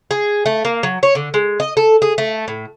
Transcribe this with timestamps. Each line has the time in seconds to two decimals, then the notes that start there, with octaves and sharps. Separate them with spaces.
0.11 G#4
0.46 A3
0.65 A#3
0.83 F#3
1.03 C#5
1.15 D3
1.34 G#3
1.60 D#5
1.77 A4
2.02 G#4
2.18 A3
2.48 A2